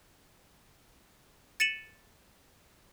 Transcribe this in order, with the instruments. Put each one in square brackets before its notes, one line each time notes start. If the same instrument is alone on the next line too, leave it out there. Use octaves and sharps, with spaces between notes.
[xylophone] A6 C#7 D#7 E7 F#7